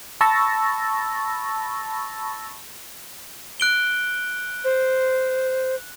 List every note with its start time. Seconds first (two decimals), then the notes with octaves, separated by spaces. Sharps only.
0.21 A5 B5 C#6 E6 A6 A#6
3.60 F#6 D7 G7
4.64 C5